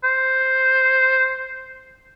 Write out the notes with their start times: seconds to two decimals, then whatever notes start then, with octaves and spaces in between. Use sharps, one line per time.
0.04 C5